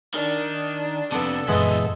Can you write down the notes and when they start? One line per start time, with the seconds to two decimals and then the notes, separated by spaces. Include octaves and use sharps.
0.14 D#3 D4
1.12 F2 C3 B3 D4 A4
1.48 F#2 A#2 E3 G#3 B3 E4 D#5